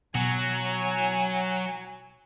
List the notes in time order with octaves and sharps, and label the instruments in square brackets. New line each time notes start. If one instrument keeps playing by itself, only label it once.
[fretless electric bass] B2 [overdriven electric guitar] F#3 [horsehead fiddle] G#5